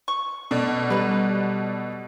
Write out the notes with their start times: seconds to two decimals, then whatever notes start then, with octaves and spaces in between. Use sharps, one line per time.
0.08 C#6
0.51 B2 A4 D5
0.90 F#3 G3 B4